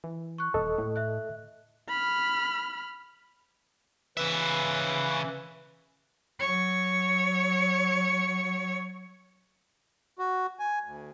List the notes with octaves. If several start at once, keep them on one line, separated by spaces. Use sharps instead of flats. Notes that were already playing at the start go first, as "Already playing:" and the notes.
E3
C#6 F#6
D#1 A4 D#5
A2
E5 F#6
B5 F6
C#3 E3 B4 E5
F#3 C#5
F#4
G#5
D2